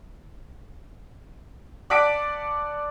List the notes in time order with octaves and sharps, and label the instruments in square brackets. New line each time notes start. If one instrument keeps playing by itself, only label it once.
[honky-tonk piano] D5 F#5 A5 D6 B6 D7